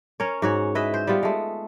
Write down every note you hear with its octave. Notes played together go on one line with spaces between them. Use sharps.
C#4 A#4 C#5
G#2 F#4 C#5
E4 B4 D#5 E5
C5
G3 B3 F4
G#3 A3